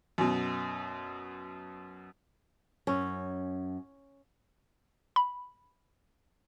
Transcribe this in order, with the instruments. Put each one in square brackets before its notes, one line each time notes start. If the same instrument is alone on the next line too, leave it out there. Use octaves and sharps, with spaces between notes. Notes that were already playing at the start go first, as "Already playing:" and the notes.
[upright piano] F#2 B2
[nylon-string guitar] F#2 [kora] C#4
[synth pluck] B5